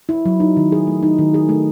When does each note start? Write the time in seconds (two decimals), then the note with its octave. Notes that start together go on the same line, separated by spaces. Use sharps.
0.09 E4
0.26 F#3
0.40 D#4
0.57 D#3
0.72 G#4
0.87 A3
1.03 D#4
1.18 D#3
1.34 G#4
1.49 A3